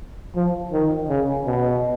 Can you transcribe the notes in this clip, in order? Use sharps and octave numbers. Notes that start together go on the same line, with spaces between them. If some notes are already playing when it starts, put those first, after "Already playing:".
F3
D#3
C#3
B2